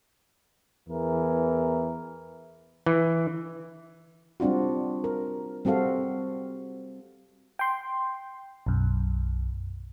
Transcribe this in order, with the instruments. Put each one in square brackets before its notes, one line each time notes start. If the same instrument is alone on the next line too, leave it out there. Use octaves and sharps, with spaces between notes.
[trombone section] E2 E3 A#4
[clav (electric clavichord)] E3
[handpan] G3 C4 D4 F4 F#4
A#4
G3 C4 F#4 A4 F5
[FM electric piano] G5 C6
B1 F#2